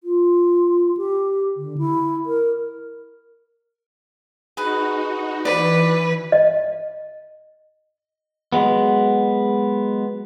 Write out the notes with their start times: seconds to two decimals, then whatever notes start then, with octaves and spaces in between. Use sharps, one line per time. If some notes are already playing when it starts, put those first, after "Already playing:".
0.04 F4
0.97 G4
1.57 D3
1.78 E4
2.26 A#4
4.57 D#4 F#4 G#4 B4
5.45 E3 B4 D5
6.32 D#5
8.53 F#3 G#3 B3